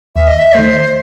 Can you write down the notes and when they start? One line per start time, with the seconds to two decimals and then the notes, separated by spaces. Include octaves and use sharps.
0.15 D#2 E5
0.27 D#5
0.38 E5
0.55 D#3 A3 C5